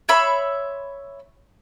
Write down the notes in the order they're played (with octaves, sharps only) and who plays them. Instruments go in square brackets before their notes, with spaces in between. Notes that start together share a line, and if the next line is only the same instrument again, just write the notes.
[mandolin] C#5 E5 B5 C6